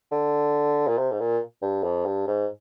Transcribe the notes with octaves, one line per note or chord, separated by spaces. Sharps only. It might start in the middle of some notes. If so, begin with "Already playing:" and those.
D3
A#2
C3
G#2
A#2
G2
F2
G2
G#2